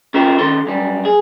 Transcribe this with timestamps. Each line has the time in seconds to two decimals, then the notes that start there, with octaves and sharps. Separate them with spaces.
0.14 C#4 F4 G4 A#4 C5 G5
0.39 D#3 C#4 A4 C6
0.67 F#2 G3
1.05 G#4